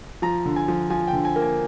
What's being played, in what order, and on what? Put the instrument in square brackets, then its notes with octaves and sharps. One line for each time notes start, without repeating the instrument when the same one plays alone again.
[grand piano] F3 A#5
D3
G#5
F3
F3 G#5
G5
D3
G#5
A#3
G#5